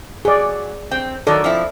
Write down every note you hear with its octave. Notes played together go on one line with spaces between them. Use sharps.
F#3 G#4 D5
C4 G5
D#3 F#3 A4 D5
F3 C4 E4